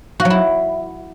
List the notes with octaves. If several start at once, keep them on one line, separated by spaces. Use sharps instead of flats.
F#4
F#3
E4